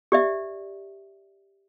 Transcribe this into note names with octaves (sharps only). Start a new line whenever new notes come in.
G4 D5 E5